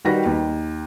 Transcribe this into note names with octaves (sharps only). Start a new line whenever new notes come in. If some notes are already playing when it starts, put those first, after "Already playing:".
D#3 G3 F#4 B4 A#6
D#2